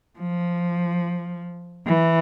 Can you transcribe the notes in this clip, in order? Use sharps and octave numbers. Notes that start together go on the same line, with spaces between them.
F3
E3